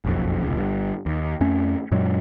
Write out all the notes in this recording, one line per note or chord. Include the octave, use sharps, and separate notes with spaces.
F#1 B1 F2
E1 C#2
G1 G2
D#2
F2 A3 C#4
F#2 A#2 F#3 G#3